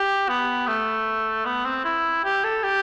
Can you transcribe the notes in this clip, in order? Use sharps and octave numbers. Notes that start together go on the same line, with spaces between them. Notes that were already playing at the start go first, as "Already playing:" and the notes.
Already playing: G4
B3
A3
B3
C4
E4
G4
A4
G4